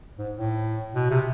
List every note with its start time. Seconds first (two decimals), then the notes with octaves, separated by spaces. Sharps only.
0.19 G#2
0.35 A2
0.95 B2
1.11 C3